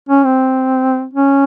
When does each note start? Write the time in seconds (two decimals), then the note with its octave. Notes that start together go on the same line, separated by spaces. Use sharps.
0.09 C#4
0.24 C4
1.14 C#4